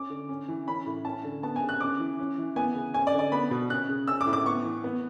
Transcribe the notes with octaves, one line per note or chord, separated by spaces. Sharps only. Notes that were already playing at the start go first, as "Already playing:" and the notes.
Already playing: C#4 D6
D3
C#4
E3
C#4 B5
A2
C#4 A5
D3
B3 A5
G#5
C#3
F#6
C#4 D6
E3
C#4
E3
B3 G#5
C#3
C#4 G#5
D5
D3
D5
B3 B5
B2
C#4 F#6
C#3
C#4 E6
D6
A2
D6
B3 C#6
E3
B3